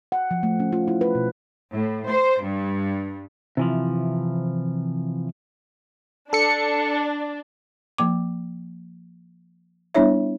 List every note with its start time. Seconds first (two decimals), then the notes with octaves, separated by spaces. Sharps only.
0.12 F#5
0.31 F3
0.43 A3
0.60 C#4
0.72 F4
0.88 E4
1.01 B4
1.15 B2
1.73 A2
2.09 C5
2.42 G2
3.57 C3 E3 F3
6.33 D4 A4 C#7
7.98 F3 A#3 D6
9.94 G3 B3 D4 E4 C#5 E5